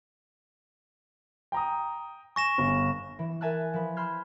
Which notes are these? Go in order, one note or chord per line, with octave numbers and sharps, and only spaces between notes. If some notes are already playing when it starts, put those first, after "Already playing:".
G5 A#5 D#6
G#5 C#6 A#6 E7
G1
E3
A#4 E5 G#5 A5 E6 F#6
F3 B4
B5 C6 E6 F6 G6 G#6